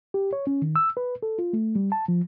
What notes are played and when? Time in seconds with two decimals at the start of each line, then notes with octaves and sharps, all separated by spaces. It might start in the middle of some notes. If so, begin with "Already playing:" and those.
0.14 G4
0.33 C#5
0.47 C#4
0.62 D#3
0.76 E6
0.97 B4
1.23 A4
1.39 F4
1.53 A3
1.75 G3
1.92 A5
2.08 F3